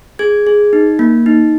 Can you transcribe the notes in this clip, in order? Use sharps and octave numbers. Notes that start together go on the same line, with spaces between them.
G#4 G#6
G#4
D#4
A#3
D#4